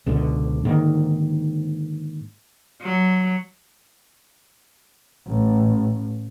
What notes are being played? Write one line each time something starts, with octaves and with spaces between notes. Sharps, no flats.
C#2 G#2 B2 D3
G#2 D3 D#3 A#3
F#3
A1